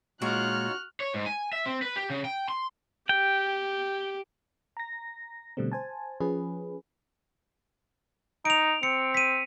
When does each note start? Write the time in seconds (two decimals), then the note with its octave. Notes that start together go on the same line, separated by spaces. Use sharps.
0.22 A#2 G#3 D#4 F4 F#4 C#5 F6 F#6
1.00 C#5
1.14 G#2
1.26 G#5
1.53 E5
1.66 C4
1.82 B4
1.96 G4
2.10 C#3
2.25 G5
2.49 C6
3.09 G4 G5
4.77 A#5 A#6
5.57 B2 D3 G3 A3 C4
5.72 C5 G#5 A5
6.21 F3 C#4 G#4 B4
8.45 D#4 D7 F7
8.83 C4 C#7
9.15 B6 D#7